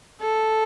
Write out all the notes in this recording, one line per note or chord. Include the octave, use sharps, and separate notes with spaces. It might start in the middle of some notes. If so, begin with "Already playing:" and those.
A4